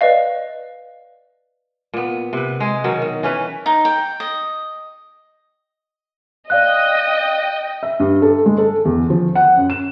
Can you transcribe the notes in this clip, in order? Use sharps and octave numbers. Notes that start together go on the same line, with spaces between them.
B4 D5 D#5 F5
A#2 B3
C3 B4
G#3 G#4
B2 D#3 F#3
D#3
E3 C#4 B4
D#4
G5
D#5
D5 D#5 F5 G5 F#6
E5
G2
A4
G#3
A4
E2
F3
F#5
F#2
E7